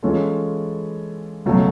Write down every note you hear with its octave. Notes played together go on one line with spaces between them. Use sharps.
E3 G#3 C#4 F4 A4
C#2 B2 F#3 A3